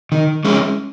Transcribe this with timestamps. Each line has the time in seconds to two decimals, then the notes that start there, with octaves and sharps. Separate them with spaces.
0.12 D#3
0.45 G#3 C#4 E4